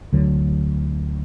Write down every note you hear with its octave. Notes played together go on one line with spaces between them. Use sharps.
D2 D3 F#3